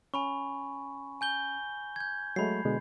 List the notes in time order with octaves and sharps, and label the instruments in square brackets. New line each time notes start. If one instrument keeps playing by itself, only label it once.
[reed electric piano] C#4 [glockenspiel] G#5 B5 C#6
[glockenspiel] G#5 G6 G7
G6 G#6
[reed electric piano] F#3 G#3 A3 [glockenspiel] B5 C7
[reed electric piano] B2 D3 G#3